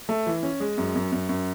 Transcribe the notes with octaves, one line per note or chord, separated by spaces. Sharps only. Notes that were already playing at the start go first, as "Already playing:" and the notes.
A3
E3
C#4
G#3
F#2
F#2
F#2
F#2